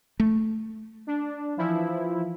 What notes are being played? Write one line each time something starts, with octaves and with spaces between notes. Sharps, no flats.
A3
D4
E3 F3 E4